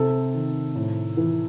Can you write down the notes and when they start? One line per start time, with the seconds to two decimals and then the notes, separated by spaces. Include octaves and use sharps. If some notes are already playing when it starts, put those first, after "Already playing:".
Already playing: C3 A4
0.34 D#3
0.75 A2
1.17 E3